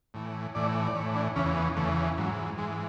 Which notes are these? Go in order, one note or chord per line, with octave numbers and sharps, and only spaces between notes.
A2 E3
A2 E3 D5
D5
A2 E3 C#5
D4
E2 C#3 E3 C#4
B3
E2 C#3 E3 A3
G#2 E3 F#3
G#2 E3 G#3